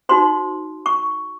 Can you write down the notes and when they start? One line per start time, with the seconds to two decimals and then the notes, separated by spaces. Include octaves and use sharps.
0.09 D#4 F#4 C5 C6
0.86 C#6